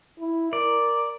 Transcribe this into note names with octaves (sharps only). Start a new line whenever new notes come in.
E4
A#4 D5